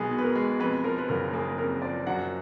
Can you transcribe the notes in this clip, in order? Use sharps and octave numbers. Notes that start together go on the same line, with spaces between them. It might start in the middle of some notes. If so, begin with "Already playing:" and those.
Already playing: B1 G#3 B3 G#4 A#4
B2
B4
A#4
G#3
F2 B4
F3 A#4
B4
F#1 A#4
A#3 G#4
F2 A#4
F3 D5
F#2 F#5